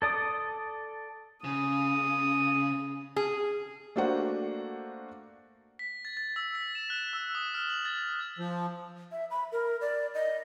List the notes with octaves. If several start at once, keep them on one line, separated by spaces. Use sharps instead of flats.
A4 D5 D#6
C#3 D#6
G#4
A3 A#3 D4 F#4 C5 F#5
B6
A6
A6
E6
B6
E7
F#6
E6
D#6
F6
F#7
A6
F3
E5
B5
A#4
D5
D#5